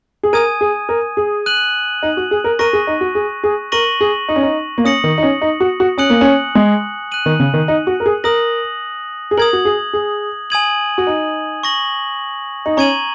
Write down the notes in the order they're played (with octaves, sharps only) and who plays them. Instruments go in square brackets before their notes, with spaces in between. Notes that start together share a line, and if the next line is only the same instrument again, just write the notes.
[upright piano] G#4
[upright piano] A#4 [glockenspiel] G#5 D#6 G#6 D#7
[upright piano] G#4
A#4
G#4
[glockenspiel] F#6 D#7 F#7
[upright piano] D#4
F#4
G#4
A#4
[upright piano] A#4 [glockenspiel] C#6 A#6 D#7
[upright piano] G#4
D#4
F#4
G#4
G#4
[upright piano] A#4 [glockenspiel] C#6 A#6 D#7 F#7
[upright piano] G#4
D#4
C#4
D#4
A#3
[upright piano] C#4 [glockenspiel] D#6 A#6 C#7 F#7
[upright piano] D#3
D#4
C#4
D#4
F#4
F#4
[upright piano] C#4 [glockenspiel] G#5 D#6 F#6 C#7 F#7
[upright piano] A#3
C#4
G#3
[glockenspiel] F#6 D#7 F#7
[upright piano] D#3
C#3
D#3
D#4
F#4
A#4
G#4
[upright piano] A#4 [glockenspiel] D#6 A#6 F#7
[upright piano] G#4
[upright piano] A#4 [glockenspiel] D#6 G#6 F#7
[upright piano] F#4
G#4
G#4
[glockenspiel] G#5 D#6 G#6 D#7 F#7
[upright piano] F#4
D#4
[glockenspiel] C#6 A#6 F#7
[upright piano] D#4
[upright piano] C#4 [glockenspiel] A#5 C#6 G#6 D#7 F#7